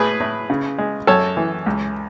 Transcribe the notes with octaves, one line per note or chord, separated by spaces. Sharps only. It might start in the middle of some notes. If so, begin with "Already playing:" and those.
Already playing: A2 G#4 B4
A2
C#3
G#3
F#2 A4 C#5
E3
C#2